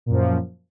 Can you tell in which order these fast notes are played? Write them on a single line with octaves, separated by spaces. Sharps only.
A#2 F#2 F3